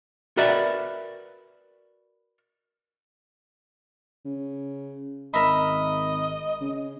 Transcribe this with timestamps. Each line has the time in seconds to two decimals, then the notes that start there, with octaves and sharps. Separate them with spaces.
0.37 F#4 A#4 B4 D5 E5
4.25 C#3
5.34 G#1 A#4 D#5 E5 B5
6.61 C#3